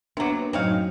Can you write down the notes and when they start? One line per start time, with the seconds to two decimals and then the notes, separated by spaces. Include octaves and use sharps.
0.17 C3 F#3 A#3 B3 D4 A#5 D6
0.53 F#2 A2 F#3 C4 D#4 C#5 F5